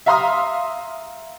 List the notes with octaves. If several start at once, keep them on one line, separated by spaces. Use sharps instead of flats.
E5 F5 A#5 C6 D#6 F6